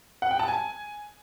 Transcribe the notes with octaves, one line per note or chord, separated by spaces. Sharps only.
F#5
G5
A5
G#5